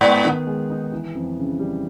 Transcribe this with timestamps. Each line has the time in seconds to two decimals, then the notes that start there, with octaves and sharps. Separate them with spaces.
0.01 G#2 B3
0.25 D#3
0.47 G#3
0.70 D#4
0.92 E3
1.15 F2
1.38 C#3
1.59 G3